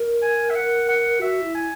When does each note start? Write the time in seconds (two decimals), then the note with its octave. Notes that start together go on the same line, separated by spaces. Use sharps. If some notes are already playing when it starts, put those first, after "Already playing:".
Already playing: A#4
0.22 G#5
0.50 E5
0.56 F#5
0.89 F#5
1.21 F#4 E5
1.43 E4
1.55 G#5